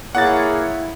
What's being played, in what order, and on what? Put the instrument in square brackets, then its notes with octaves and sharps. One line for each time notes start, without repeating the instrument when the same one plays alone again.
[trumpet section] A#3 G#4 C#5 [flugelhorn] E4 [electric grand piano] F#5 A6